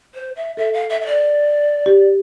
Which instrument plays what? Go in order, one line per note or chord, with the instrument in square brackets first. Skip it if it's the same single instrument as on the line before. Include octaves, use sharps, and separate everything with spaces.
[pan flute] C5
E5
[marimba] A4 [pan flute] E5
[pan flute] F5
E5
E5
D5
[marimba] G4